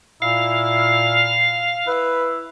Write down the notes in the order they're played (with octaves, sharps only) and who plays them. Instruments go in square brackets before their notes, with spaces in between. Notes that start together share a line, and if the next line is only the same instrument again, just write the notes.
[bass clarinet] A#2 [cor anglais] E4 [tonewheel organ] F5
[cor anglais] E4 [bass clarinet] B4